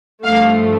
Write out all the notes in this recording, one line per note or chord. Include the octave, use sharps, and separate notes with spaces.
G2 F3 A3 F5